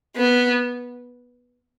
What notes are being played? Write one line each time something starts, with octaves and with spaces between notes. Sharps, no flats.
B3